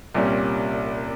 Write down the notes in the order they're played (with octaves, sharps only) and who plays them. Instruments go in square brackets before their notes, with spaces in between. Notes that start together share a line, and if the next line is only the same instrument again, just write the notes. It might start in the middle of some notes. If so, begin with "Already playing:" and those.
[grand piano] C2 A#2 G3 C#4 G4